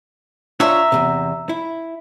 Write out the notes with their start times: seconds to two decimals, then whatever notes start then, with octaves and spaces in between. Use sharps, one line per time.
0.60 D4 F4 C#5 E5 A#5
0.92 E2 G2 C3
1.49 E4